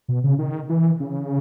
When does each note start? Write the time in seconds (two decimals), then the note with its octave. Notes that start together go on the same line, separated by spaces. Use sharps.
0.08 B2
0.24 C#3
0.39 D#3
0.69 E3
1.00 C#3